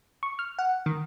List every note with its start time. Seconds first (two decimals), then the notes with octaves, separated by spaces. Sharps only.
0.23 C#6
0.39 F6
0.59 F#5
0.86 D#3